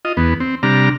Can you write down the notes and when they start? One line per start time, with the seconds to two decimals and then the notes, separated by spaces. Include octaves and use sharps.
0.05 F4 D#5
0.17 E2 B3
0.40 C4
0.63 C3 G3 D4 A#5 F6